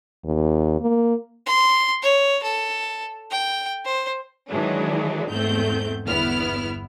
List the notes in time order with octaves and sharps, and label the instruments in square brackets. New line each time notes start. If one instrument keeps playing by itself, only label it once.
[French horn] D#2
A#3
[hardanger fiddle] C6
C#5
A4
G5
C5
[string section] D#3 E3 F#3 G#3 D4
E2 G#2 A3 C4 G6
G1 E2 B3 E4 F6